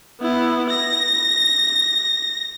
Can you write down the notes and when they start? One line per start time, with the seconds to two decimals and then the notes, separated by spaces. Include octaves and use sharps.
0.21 B3 E4
0.70 A#6